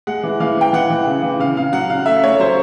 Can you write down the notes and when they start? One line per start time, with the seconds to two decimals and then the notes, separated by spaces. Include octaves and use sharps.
0.07 G#3 F#5
0.23 E3
0.40 E3 F5
0.57 E3 G5
0.73 E3 F#5
0.90 E3
1.07 C#3
1.23 E3
1.39 C#3 F5
1.57 C#3 F5
1.72 F#3 F#5
1.90 C#3 F5
2.06 A3 E5
2.23 A3 C#5
2.39 F#3 C5